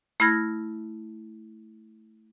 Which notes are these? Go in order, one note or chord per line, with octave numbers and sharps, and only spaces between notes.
A3 E4 B5 F6 G#6 A#6